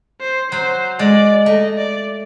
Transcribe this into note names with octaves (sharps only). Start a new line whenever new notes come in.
C5
F#3 C5
G#3 D5
A3 D#5
D5